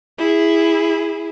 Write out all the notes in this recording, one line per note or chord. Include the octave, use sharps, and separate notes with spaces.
E4 G#4